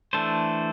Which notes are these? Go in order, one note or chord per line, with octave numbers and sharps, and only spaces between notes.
E3 A3 D4 A4 C5